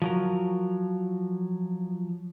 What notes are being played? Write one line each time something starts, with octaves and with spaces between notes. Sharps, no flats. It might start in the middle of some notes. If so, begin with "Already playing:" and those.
F3 F#3 A#4